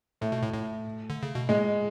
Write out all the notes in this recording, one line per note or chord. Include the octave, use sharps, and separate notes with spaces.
A2 A3
B2
A2
A2
D3
C#3
B2
A2 G#3